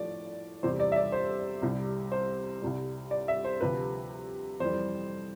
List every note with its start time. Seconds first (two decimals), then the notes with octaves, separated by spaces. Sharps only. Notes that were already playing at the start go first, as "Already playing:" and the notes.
Already playing: A2 F3 D5
0.63 E2 C3 G3 C5
0.80 D5
0.92 E5
0.96 D5
1.12 C5
1.62 C2 C3 G3
2.12 C5
2.62 C2 C3 G3
3.11 D5
3.28 E5
3.44 C5
3.61 D2 C3 F3 B4
4.60 F2 E3 G3 C5